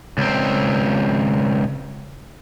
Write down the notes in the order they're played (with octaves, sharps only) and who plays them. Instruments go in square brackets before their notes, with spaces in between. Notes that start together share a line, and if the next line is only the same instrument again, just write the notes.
[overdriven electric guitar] C#2 C4